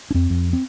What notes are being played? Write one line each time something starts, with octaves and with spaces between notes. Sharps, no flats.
D4
F2 C4
F2
C4